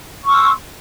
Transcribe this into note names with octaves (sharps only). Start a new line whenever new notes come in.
C6 C#6 E6 F6